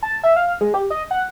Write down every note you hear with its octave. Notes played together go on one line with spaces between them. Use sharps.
A5
E5
F5
G#3
G4
D#5
F#5